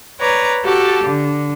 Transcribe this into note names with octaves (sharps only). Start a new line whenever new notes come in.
B4 C#5 D5 A#5
F#4 G4 A4 A5
D3